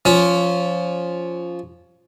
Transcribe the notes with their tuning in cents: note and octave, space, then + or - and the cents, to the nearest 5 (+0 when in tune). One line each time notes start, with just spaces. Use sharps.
F3 +0 C#4 +15